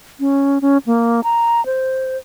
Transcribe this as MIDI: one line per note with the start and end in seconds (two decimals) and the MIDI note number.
0.20 0.58 61
0.62 0.78 61
0.86 1.21 58
1.24 1.64 82
1.66 2.17 72